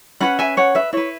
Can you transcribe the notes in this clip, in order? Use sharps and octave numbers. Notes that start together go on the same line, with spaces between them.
C#4 F#4 B4 F#5 B5
E5 G#5
C#5 F#5
B4 E5
E4 B4 C#5